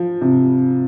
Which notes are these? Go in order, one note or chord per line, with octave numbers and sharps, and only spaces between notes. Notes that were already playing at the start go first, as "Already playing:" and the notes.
Already playing: F3
C3